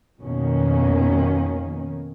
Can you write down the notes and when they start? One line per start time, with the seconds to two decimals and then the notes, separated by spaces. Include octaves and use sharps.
0.21 F2 B2 D#3 A#3 C#4